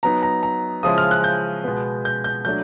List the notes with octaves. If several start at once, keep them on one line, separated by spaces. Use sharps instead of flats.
F#3 B3 D#4 A#5
A#5
A#5
C#3 F3 G#3 C#4 E4 D#6
F6
F#6
G6
B2 G#3 B3
G6
G6
F#3 A3 D4 G6